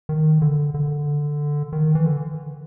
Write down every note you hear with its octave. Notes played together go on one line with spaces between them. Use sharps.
D#3
D3
D3
D#3
E3
D3